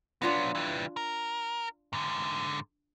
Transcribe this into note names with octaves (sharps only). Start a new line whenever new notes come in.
F#3 B3 D4 F4 A#5
E3 G3
A#4
G#2 D3